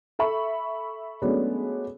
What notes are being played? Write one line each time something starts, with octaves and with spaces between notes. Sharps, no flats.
A4 E5 B5 C#6
F#3 G#3 A3 B3 C#4 D4